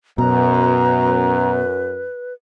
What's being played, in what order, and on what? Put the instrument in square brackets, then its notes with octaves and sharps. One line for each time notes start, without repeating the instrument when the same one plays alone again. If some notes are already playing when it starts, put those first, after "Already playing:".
[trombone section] F#2 [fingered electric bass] B2 [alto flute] B4 [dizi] A#5